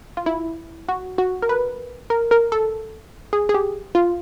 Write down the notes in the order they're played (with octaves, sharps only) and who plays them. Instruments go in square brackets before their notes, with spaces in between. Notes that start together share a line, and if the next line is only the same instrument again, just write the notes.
[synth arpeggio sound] F4
E4
F#4
F#4
A#4
B4
A#4
A#4
A4
G#4
G#4
G4
F4